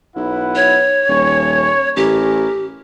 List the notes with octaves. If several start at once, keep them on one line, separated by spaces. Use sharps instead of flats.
B1 E4 B4 F#5
C#5
D#1 C#6
A1 A3 G4 A#4 G#5